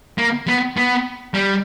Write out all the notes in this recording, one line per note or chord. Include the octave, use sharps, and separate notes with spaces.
A#3
B3
B3
G3